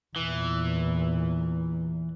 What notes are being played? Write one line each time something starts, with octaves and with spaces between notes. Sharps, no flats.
E2 A#2 E3